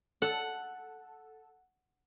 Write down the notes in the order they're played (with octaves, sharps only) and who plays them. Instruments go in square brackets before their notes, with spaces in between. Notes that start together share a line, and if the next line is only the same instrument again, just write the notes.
[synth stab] A4 [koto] F#5